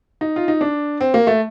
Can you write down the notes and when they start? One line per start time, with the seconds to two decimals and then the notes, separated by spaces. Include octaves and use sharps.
0.21 D#4
0.36 F4
0.48 D#4
0.61 D4
1.01 C4
1.14 A#3
1.27 A3